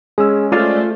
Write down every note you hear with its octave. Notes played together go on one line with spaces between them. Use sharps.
G#3 C#4 G#4 E6
A3 F4 G#4 C5 D5 F5